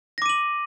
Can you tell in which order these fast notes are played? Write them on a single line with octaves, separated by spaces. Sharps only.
A#6 D6 D#7 F#7